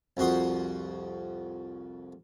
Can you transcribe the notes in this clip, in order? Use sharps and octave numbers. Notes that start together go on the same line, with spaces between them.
C2 F2 F#4 C6 D#6